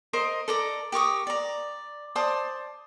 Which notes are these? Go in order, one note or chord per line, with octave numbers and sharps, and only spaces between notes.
A#4 C5 D#5
A4 A#4 D5 A#5
G4 A#4 C#6 D#6
D5 A#5
C5 D5 A5 D#6